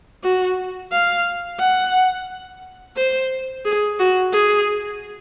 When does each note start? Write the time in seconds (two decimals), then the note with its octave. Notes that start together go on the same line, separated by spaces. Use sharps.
0.24 F#4
0.92 F5
1.60 F#5
2.96 C5
3.65 G#4
3.99 F#4
4.33 G#4